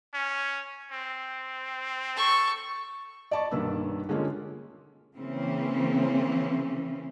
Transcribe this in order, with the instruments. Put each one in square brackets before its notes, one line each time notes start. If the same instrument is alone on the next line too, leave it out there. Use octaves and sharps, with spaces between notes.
[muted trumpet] C#4
C4
[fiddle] A4 C#6
[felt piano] D5 D#5 A5 B5 C#6
B1 G2 D#3 A#3 B4 E6
D3 G#3 A#3 C#4 F4
[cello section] C#3 E3 A#3 C4 C#4